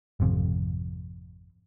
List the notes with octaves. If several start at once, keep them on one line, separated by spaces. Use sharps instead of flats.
G#1 F2 C3 F3